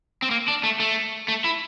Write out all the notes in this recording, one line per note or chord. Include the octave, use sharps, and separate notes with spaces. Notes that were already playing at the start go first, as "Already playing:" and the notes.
C4
A#3
D4
A3
A3
A3
E4